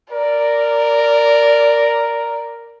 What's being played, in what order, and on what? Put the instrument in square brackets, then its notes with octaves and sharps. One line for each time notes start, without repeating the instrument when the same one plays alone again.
[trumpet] A#4 [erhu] D5